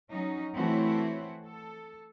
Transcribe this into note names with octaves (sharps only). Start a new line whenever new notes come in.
F#3 C#4 D#4
E3 A3 C4 E4 F#4 C#5
A4